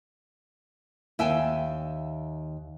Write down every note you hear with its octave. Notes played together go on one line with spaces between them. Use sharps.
D#2 E5 G5 G#5